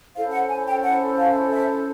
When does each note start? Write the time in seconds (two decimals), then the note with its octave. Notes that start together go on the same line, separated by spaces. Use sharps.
0.15 C#4 E4 A4 C5 F5
0.32 F#5
0.49 G#5
0.66 G5
0.83 F#5
1.17 F5
1.51 E5